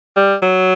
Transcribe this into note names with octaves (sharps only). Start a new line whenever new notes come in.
G3
F#3